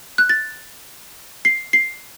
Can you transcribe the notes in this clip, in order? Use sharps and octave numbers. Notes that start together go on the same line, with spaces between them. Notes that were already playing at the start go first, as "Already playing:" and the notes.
F#6
A6
C7
C7